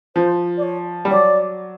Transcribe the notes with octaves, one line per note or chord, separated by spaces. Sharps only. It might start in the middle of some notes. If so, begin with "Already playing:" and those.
F3 C5
D5
C#5
G3
F#3 D5